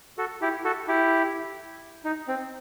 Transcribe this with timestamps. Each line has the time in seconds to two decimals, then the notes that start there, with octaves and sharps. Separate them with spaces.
0.18 F#4 A4
0.41 E4 G4
0.64 F#4 A4
0.88 E4 G4
2.05 D#4
2.28 C4